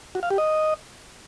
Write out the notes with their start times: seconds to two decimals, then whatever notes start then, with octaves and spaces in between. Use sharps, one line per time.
0.15 F#4
0.23 F5
0.30 G4
0.38 D#5